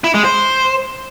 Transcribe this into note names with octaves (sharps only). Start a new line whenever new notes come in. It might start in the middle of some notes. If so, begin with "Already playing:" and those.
E4
G#3
C5